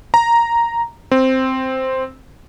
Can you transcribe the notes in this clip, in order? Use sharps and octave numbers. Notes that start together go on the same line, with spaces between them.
A#5
C4